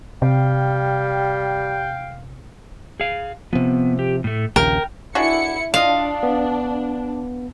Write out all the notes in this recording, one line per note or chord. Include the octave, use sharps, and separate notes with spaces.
C3 G3 F5 G5
G#4 F5
C3 F3 B3
G4
A2 A3
A#1 D#2 C#3 A#4 G5
G#3 D4 E4 F#4 C#7
D4 F4 D#5 F5
B3